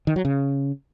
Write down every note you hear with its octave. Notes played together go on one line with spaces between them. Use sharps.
D#3
F#3
C#3